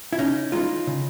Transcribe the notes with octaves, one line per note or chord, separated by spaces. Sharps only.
E4
C#3 C#4 D#4
E3 G#3 D#4 F4
C#3